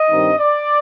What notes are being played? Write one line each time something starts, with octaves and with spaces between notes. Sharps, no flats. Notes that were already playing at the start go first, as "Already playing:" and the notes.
Already playing: D#5
G2 D#3 G3 C4 D#4
D5